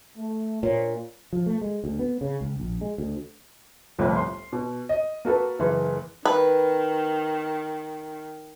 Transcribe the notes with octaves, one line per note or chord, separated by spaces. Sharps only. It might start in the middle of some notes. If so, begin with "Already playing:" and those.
A3
A#2 D4 C5 C#5
F3
A3
G#3
D2
B3
C#3
C#2
A#1
G#3
D2
G1 C2 F2 A2
C6
B2
D#5
A#3 F#4 A4 B4
F#1 E3
D#3 B4